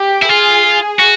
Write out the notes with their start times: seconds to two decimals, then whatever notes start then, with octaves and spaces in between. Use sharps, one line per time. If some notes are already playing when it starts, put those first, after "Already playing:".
Already playing: G4
0.22 E4
0.29 F4 G#4
0.99 F#4